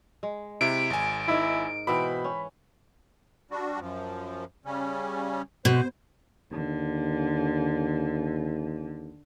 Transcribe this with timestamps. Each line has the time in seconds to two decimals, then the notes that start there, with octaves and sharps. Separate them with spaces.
0.23 G#3
0.61 C3 E4 D7
0.90 G#1 G#5
1.28 G#2 D#4 E4 A#4
1.87 B2 E3 C4 C5 B5
2.24 C#4
3.51 G3 D4 F#4
3.80 F#2 F3
4.65 C#3 G3 C#4
5.65 B2 C5
6.52 D#2 D3